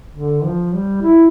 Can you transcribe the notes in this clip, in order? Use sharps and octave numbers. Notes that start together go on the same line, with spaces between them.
D3
F3
G3
E4